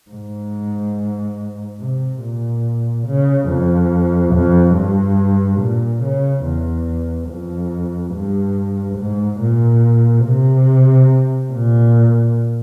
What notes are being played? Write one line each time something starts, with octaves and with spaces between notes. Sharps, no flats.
G#2
C3
A#2
C#3
F2
F2
G2
A#2
C#3
E2
F2
G2
G#2
A#2
C3
A#2